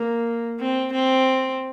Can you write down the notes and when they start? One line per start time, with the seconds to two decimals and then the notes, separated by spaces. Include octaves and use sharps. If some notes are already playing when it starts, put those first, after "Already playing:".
Already playing: A#3
0.59 C4
0.92 C4